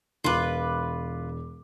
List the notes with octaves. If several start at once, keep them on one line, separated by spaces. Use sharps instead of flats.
E1 F4 B4 D6